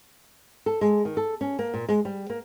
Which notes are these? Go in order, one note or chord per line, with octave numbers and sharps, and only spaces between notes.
A4
G#3
D#3
A4
C#4
A#3
A#2
G#3
G3
A#3